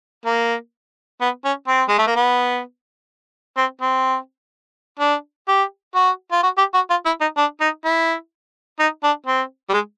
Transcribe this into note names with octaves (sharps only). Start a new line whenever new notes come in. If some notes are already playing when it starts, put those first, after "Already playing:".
A#3
B3
C#4
C4
G#3
A3
A#3
B3
C4
C4
D4
G4
F#4
F4
F#4
G4
F#4
F4
E4
D#4
D4
D#4
E4
D#4
D4
C4
G3
G#3